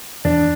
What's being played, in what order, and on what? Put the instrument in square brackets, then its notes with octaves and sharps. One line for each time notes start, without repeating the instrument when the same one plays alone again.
[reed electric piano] E2 [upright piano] D4